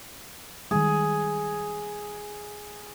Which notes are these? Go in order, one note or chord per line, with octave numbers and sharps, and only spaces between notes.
D#3 G3 G#3 G#4